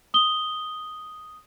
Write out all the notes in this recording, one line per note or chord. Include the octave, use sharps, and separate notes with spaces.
D#6 G7